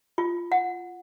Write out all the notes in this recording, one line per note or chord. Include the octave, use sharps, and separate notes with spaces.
F4
F#5